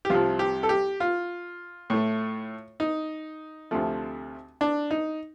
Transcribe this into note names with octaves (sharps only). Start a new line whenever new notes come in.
G4
C2 C3 F3 F4
G4
A4
G4
F4
A2 A3
D#4
D2 C3 F3 A3
D4
D#4